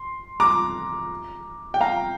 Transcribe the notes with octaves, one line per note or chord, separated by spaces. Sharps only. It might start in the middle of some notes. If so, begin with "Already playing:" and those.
Already playing: C6
A#5 D6
G5
F5 A#5